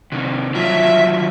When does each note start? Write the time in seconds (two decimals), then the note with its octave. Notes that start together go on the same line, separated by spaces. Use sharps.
0.12 C3 D#3
0.54 D#3 F#3 F4 E5